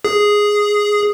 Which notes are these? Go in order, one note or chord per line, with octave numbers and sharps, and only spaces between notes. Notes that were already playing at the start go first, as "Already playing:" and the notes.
G#4